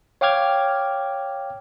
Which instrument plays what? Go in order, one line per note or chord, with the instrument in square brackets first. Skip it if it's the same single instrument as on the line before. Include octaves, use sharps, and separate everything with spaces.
[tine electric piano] C#5 F5 G5 D6 F6 G#6